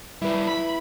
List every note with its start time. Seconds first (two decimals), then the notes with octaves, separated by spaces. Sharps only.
0.22 G3 E4 F4 B4
0.47 B5